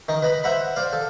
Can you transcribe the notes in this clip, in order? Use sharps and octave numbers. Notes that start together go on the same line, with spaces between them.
D#3 D#4
B4 D#5 B5
C5 E5 F#5 A#5 B5
C5 D5 F5
A4